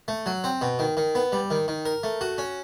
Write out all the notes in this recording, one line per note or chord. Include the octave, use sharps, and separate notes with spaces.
A3
F#3
C4
B2
D#3
D#3
B3
G3
D#3
D#3
A#4
A3
F#4
C#4